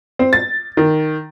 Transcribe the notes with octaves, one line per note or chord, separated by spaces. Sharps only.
C4
A6
D#3